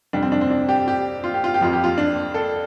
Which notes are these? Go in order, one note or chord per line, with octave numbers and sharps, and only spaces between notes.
F2 C3 G3 D4
C4
D4
C4
D4
G4
G4
F4
G4
F4
G4
F2 F3 F4
G4
F4
D4
A4